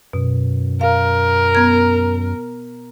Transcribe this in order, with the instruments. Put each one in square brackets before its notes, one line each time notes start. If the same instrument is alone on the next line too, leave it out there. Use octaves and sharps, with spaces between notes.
[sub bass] F#2 [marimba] B2
[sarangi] A#4 [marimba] F5
[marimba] B3 G#6